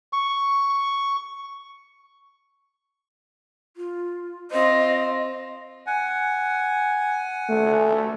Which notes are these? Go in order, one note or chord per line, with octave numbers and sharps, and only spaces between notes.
C#6
F4
C4 F4 D#5
F#5 G#5
A3